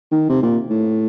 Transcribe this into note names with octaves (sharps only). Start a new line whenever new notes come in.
D#3
C3
A#2
A2